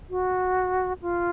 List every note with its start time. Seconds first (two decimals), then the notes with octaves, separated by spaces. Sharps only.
0.10 F#4
1.02 F4